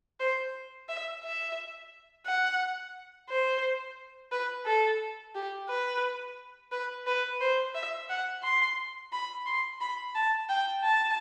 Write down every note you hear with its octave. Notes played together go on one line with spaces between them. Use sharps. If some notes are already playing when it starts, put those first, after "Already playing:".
C5
E5
E5
F#5
C5
B4
A4
G4
B4
B4
B4
C5
E5
F#5
C6
B5
C6
B5
A5
G5
A5